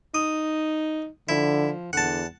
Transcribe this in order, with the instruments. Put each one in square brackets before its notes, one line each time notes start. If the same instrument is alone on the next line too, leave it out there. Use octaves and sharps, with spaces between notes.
[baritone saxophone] D#4 [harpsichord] D#6
[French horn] D3 [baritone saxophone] F3 [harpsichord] E4
[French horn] E2 [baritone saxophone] D3 [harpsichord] F#5 A5